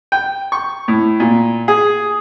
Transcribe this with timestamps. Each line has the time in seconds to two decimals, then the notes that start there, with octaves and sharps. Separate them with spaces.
0.12 G5
0.52 C#6
0.88 A2
1.20 A#2
1.68 G#4